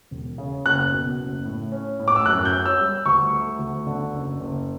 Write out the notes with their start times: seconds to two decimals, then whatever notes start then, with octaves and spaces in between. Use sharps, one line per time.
0.11 E1
0.38 C#3
0.66 F#1 F#6
0.92 B2
1.19 F#1
1.45 A2
1.72 C#4
1.99 A2
2.08 D6
2.16 E6
2.26 F#2 F#6
2.45 G6
2.53 C#4
2.66 E6
2.80 G3
3.06 D2 C#6
3.33 A3
3.59 D2
3.87 D3
4.13 F#1
4.40 F#1